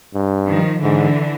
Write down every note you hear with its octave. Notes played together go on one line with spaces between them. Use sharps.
G2
D#3 F3
G#2 D3 E3